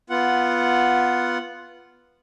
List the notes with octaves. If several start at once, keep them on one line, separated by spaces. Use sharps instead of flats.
B3 F4 F#5